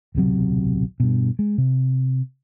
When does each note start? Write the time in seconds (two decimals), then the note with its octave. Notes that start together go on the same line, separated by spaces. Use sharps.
0.15 D1 B1 C3 F#3
1.00 G2 B2
1.39 G#3
1.58 C3